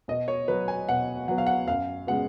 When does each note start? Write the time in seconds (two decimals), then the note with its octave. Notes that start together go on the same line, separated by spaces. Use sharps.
0.08 B2 D#5
0.28 C#5
0.48 F#3 B3 B4
0.68 G#5
0.89 B2 F#5
1.28 F#3 B3 F#5
1.38 F5
1.47 F#5
1.68 F#2 F5
2.07 C#3 G#3 B3 F#5